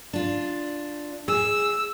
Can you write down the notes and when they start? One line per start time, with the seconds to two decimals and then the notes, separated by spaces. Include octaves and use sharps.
0.13 D4 F4
1.28 G#4 E6